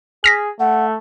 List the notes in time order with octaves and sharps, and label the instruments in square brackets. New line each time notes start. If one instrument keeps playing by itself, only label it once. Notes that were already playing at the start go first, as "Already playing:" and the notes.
[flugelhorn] G#4 [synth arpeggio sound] F6 A#6 B6
[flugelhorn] A3 [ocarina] F#5